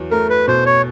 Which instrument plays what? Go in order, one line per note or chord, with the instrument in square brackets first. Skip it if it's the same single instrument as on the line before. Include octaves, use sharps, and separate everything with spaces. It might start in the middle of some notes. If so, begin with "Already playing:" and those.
Already playing: [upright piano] E2 F#3
[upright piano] A3 [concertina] A#4
[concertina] B4
[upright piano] B2 [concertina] C5
[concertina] C#5